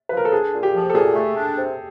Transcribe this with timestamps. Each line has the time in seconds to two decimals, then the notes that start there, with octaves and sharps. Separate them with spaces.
0.09 F3 B4
0.17 A#4
0.25 A4
0.32 D4 G#4
0.54 A#2
0.63 G4
0.74 F3
0.90 A4
0.95 A#2 G#4
1.15 A3
1.37 D4
1.57 C3